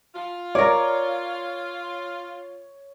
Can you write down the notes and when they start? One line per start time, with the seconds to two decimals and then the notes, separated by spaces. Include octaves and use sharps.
0.15 F4
0.55 A#4 C#5 D5